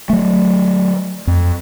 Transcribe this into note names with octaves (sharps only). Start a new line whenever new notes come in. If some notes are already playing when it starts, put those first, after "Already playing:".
F#3 A3
F2